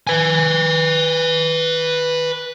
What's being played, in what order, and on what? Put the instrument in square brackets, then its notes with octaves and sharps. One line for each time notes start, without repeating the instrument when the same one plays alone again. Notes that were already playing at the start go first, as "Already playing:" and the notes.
[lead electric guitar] B4 G#5